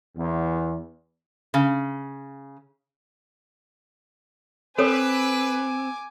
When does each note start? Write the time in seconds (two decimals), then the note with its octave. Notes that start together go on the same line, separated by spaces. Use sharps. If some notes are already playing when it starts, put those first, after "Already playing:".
0.16 E2
1.54 C#3
4.78 C4 A4 B4 C#5 G#5 D6 D#6